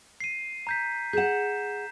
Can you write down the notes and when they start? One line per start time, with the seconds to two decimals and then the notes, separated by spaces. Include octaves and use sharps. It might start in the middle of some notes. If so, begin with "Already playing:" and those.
0.20 C7 D#7
0.67 A#5 G6 B6
1.13 G#4 F#5 G6 E7